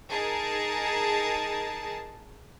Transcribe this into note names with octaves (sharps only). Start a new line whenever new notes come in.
D#4 G#4 A#4 A5